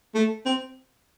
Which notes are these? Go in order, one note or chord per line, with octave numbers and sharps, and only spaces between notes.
A3
C4